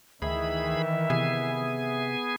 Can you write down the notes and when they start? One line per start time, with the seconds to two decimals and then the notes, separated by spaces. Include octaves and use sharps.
0.22 D2 D#3 E3 G#4 E5 B5
1.10 C3 B3 G#4 G#5